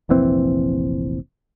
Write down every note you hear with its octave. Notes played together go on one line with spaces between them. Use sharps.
F1 A#1 E3 C4